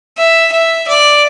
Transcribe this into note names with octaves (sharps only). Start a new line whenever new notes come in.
E5
E5
D5